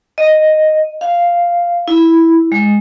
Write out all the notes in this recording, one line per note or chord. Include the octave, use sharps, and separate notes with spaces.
D#5
F5
E4
G#3